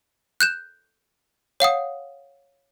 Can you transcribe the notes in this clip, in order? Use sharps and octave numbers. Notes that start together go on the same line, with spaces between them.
F#6 G6 E7
C#5 F5 F#5 D#6